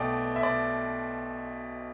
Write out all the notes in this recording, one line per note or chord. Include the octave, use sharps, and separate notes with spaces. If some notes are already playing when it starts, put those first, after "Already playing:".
Already playing: B1 B2 A3 D5 E5 G5
E5
D5